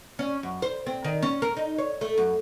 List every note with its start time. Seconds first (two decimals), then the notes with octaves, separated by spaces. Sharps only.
0.19 C#4
0.43 F#2
0.62 C5
0.87 C4
1.05 D#3
1.23 C#4
1.42 A#4
1.57 D#4
1.78 C#5
2.01 A3
2.18 F#2